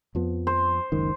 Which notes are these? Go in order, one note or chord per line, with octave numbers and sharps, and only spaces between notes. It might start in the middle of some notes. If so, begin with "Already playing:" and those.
F2 F3 B3
C5
F#1 C#2 D#3